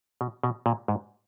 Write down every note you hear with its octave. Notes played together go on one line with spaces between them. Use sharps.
B2
B2
A#2
G#2